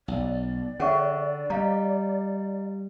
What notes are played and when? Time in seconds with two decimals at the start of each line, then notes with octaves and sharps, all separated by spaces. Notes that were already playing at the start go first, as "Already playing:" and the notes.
0.08 B1 D5
0.80 D3 C#4 G#4 C#5 E5 F#5 C#6
1.50 G3 D#5 F5 A#5